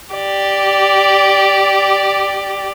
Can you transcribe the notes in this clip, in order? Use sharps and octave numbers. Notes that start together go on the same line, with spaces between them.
G4 D5